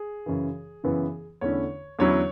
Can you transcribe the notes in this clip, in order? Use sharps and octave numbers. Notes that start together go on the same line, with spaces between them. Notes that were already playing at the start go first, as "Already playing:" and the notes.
Already playing: G#4
F#2 C#3 E3
F#2 C#3 E3 B3 E4
E2 D3 A3 C#4 E4 C#5
E2 D3 F#3 C#4 E4 C#5